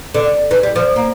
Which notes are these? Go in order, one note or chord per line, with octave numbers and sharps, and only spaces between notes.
D3
E3
G3
F3
A#3